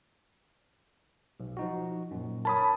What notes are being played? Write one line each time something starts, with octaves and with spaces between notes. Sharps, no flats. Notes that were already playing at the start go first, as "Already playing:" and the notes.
B1
F3 D#4 F#4
F#2 A#2
A#4 C#5 A5 B5 D#6